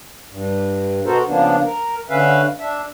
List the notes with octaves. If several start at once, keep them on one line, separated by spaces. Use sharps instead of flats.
G2
B2 B3 F#4 A4 A#4 C5
C#3 F3 A#3 B3 D4
A#4
D3 C#4 B4 E5 F5
D4 E5